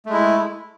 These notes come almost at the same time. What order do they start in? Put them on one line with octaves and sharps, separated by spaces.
A3 G#3 E4